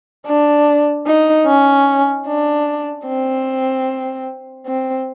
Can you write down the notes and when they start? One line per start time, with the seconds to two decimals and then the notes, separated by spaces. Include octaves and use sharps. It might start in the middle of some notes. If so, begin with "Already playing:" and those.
0.26 D4
1.07 D#4
1.46 C#4
2.27 D4
3.07 C4
4.66 C4